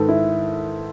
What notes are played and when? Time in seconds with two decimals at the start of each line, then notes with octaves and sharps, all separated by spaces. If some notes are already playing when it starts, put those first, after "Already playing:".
Already playing: G#2 D#3 A4 B4
0.09 E4